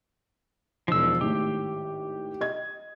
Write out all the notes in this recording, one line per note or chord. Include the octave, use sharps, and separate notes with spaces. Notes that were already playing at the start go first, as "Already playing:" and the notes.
E1 F3 D#4 E6
G#1 A2 G4
D#5 G#6